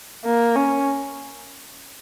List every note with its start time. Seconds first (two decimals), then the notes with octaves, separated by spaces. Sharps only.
0.24 A#3
0.55 C#4